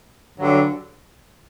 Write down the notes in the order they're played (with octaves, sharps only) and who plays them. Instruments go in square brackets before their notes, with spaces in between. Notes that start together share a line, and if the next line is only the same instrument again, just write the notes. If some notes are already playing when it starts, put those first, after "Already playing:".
[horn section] G2 D3 F#3